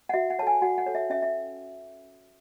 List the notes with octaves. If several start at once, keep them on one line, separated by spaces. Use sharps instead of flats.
F#5
F#4 E5
F#5
A4 C#5 G#5 A5
F#4 F#5
F#5
A4 C#5
E5
C#4 E5
E5